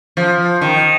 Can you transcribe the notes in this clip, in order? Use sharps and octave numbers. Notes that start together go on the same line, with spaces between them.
F3
D#3